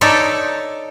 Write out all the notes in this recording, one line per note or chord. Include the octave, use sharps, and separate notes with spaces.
D#4 A4 C#5 D5 E5